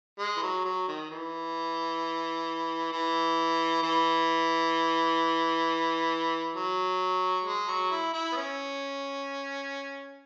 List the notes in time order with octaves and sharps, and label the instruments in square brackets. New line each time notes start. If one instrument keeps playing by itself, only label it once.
[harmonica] G#3
E3
F#3
F#3
D#3
E3
E3
E3
F#3
G#3
F#3
E4
E4
B3
C#4